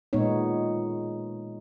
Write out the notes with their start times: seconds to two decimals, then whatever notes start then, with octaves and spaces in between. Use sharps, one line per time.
0.13 A#2 G#3 B3 D#4 C#5